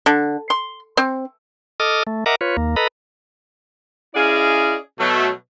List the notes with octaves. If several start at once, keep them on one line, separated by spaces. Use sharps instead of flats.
D3
C6
C4
A4 D#5 D6 D#6 F6
A3
A#4 D#5 E5 F#5 A#5 D6
F4 B4 C#5
D#2 A#3
A4 B4 D#5 A#5 B5
C#4 E4 G#4 D5 D#5 F5
B2 F#3 A3